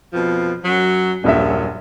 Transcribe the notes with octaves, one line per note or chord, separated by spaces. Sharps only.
F2 B2 F3
F#2 F#3
D#1 A#1 F#2 E5